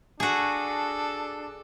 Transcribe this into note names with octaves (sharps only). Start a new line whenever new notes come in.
D4 F#4 G#4 A4